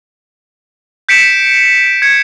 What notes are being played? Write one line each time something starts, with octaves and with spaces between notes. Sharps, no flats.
G6 B6 C#7 D7 E7
G#6 C#7